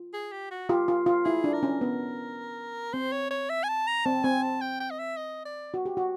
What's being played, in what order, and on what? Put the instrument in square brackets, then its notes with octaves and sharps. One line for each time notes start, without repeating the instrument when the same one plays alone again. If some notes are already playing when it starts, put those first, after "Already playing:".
Already playing: [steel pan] F4
[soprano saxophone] G#4
G4
F#4
[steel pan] F4 G4
F4
F4
[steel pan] E4 [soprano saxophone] G#4
[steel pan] D4
[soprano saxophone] A#4
[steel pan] C#4
B3
[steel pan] C4 [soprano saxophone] C5
[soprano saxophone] C#5
C#5
E5
G#5
A5
A#5
[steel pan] C4 [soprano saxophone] A5
[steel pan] C4 [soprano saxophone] G#5
[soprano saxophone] A5
G5
G5
D#5
E5
D#5
D5
[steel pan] F#4
G4
F#4